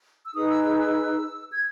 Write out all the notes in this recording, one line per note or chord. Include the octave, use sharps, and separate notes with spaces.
E6
D#4 G#4 B4 D#6
E6
E6
E6
G#6